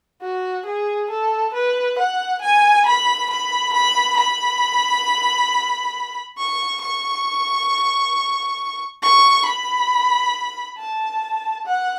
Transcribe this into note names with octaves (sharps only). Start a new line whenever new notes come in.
F#4
G#4
A4
B4
F#5
G#5
B5
B5
B5
B5
C#6
C#6
C#6
B5
A5
F#5